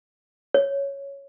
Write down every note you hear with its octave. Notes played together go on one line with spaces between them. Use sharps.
C#5